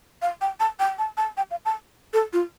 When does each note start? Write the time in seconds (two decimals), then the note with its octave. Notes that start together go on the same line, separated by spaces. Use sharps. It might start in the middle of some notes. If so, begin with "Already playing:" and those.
0.22 F5
0.41 G5
0.60 A5
0.79 G5
0.98 A5
1.17 A5
1.37 G5
1.51 F5
1.65 A5
2.13 A4
2.33 F4